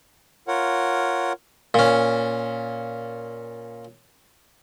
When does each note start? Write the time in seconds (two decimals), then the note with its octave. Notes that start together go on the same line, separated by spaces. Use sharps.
0.48 F4 A#4 C#5 F#5
1.74 A#2 C#4